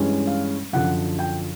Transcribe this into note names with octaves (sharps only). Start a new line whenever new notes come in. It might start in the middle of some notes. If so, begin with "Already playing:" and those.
Already playing: G2 E3 G#3 C#4
F5
F#2 D3 F3 F#5
G5